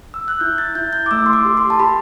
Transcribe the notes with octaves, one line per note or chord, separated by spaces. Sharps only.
E6
F#6
E4 G6
A6
E4 G6
G6
D6
A3 E6
C6
D6
G4
C6
A5
G4 B5